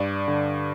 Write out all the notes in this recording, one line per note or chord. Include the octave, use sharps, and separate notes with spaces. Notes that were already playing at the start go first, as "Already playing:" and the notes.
Already playing: G2 D5
D3